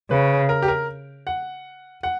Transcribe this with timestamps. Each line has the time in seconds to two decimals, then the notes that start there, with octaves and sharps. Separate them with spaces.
0.10 C#3 B4
0.49 A#4
0.62 G4
0.68 A#4
1.27 F#5
2.03 F#5